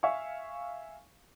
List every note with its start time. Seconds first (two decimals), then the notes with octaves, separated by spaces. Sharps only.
0.03 E5 F5 G#5 C#6